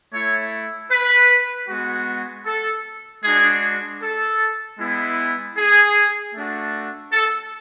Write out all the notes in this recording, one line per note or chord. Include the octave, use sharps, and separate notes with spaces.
A3 E4 C#5
B4
G#3 B3 F#4
A4
G#3 D4 F#4 G#4
A4
G#3 B3 E4
G#4
A3 D4 F#4
A4